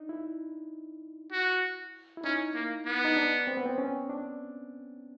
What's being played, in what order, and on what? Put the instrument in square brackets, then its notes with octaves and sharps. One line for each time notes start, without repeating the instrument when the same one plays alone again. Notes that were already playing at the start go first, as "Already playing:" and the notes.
Already playing: [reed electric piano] D4 D#4
E4
[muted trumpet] F#4
[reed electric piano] E4
[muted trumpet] C#4 [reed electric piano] D#4
[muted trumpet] A#3
B3
[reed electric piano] D#4
D4
C4
B3
C4
C#4
D4